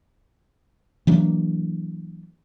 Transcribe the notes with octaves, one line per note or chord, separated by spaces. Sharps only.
E3 F#3 A#3 D4